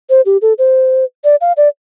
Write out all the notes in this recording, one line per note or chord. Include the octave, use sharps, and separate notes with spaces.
C5
G4
A4
C5
D5
F5
D5